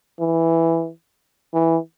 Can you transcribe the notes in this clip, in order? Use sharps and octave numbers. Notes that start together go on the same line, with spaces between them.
E3
E3